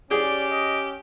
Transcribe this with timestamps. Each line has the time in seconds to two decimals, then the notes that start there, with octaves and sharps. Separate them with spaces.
0.11 C#4 G4 G#4 D5
0.51 D#5